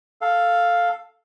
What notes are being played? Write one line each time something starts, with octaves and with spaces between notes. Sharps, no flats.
A4 F5